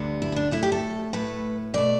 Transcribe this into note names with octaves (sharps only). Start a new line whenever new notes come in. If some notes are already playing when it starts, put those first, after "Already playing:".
Already playing: D2 D3 G3 B3
E4
B3
D4
A2 A3 E4
G4
A4
A2 A3 B4
B2 A3 D5